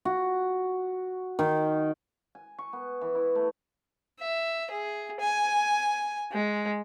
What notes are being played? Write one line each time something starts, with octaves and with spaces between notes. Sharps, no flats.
F#4
D#3
G#5
C#6
B3
E3
E4
A3
E5
G#4
G#5
G#3